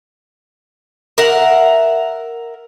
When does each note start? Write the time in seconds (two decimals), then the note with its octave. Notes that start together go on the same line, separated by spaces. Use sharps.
1.18 A#4 E5 F#5